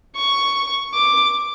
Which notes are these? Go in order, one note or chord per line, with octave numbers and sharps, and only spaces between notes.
C#6
D6